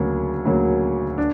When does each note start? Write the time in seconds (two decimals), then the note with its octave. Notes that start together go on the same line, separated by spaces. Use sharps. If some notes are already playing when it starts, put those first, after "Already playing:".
Already playing: D2 C#3 F#3 A#3
0.45 D2 C#3 F#3 A#3
1.18 D4